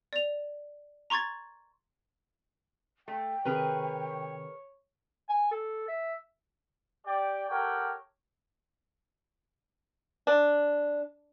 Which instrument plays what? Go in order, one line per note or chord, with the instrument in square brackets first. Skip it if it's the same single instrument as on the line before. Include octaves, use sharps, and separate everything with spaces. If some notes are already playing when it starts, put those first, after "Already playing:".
[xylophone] D5 F7
A#5 C6 C#6 G#6 A6
[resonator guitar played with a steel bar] A3 [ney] G5
[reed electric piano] C3 D#3 [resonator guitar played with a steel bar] G#4 A#4 B4 [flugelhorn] C#5
[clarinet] G#5
A4
E5
[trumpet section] G4 D5 G5
G4 A4 A#4 C#5 F#5 G5
[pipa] D4